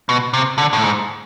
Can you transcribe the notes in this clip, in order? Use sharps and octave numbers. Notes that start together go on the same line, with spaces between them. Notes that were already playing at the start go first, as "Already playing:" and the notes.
B2
C3
D3
A2
G#2